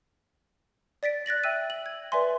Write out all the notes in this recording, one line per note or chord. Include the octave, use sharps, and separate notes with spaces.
D5 A6 B6 D7
F#6 A6 A#6 F#7
E5 G5 E6 D#7
F#7
G#6
B4 D5 E5 G#5 C6